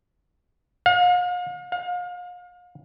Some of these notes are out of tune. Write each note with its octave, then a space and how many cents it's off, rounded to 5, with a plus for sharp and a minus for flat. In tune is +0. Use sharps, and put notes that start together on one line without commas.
F5 +40
F5 +35